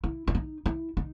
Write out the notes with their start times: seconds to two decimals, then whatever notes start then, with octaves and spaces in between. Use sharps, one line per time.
0.04 E4
0.27 E4
0.35 D#4
0.66 E4
0.97 D#4